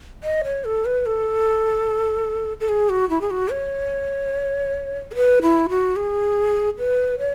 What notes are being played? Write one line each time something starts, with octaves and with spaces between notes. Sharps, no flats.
D#5
C#5
A4
B4
A4
A4
G#4
F#4
E4
G#4
F#4
C#5
A4
B4
E4
F#4
G#4
B4
C#5